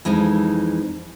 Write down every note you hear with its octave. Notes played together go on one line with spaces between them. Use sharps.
F2 E3 G#3 D#4